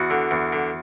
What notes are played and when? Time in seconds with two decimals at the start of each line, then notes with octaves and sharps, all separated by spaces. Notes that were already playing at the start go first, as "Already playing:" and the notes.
Already playing: E2 F#4
0.10 D3
0.31 E2
0.52 D3